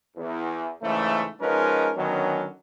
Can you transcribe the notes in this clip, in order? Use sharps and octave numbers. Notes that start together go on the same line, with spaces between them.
E2
G#2 C#3 E3 A3
F3 G#3 C#4 D#4 A#4 B4
D3 D#3 F#3 B3 C#4